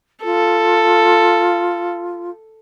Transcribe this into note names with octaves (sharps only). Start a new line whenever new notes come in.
F4 A4